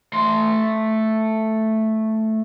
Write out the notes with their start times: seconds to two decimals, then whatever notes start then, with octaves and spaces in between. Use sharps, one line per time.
0.13 A3 C6